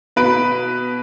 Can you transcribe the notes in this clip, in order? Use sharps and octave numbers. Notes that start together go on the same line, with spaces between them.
B2 B4 B5 D7